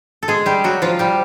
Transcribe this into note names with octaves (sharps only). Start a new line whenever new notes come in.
A4
G#3 G#4
G3 G4
F#3 F#4
F3 F4
G3 G4